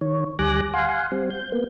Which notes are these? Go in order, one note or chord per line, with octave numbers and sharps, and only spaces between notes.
D#3 C#5
D2 G3 G#5 D6 F#6 A#6
F5 F#5 G#5 C6
G3 C4
G6
A#3 B3